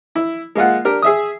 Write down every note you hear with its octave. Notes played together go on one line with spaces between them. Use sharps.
E4
G#3 A#3 F4 F#5
D4 G4 A#4
G#4 E5 D#6